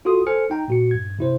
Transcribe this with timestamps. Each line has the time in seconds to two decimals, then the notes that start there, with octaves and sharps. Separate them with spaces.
0.05 F4 F#4 A4 C6 D#6
0.26 A4 C5 G#5 F6 C#7
0.50 D#4 G5 A#5
0.68 A#2 F#4 C#7
0.91 G2 G#6
1.19 C3 E4 C5